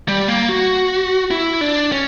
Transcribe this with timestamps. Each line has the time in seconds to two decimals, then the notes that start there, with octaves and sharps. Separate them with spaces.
0.08 G3
0.28 A#3
0.49 F#4
1.31 E4
1.61 D4
1.92 C#4